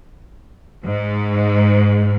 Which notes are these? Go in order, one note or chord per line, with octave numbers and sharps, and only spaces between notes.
G#2